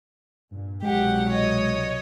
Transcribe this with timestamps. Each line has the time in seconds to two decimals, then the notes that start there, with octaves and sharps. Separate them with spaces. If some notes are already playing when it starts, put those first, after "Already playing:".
0.51 G2 A#2
0.83 C2 B2 F#3 G#3 G4 F#5
1.29 C#5 D#5